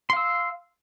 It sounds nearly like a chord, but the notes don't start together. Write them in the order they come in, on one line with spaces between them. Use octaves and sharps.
C6 F5 E6